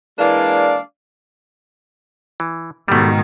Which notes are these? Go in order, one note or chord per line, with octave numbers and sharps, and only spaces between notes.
E3 G#3 A#3 D4 D5 F5
E3
G#2 B2 D#3 G3 A3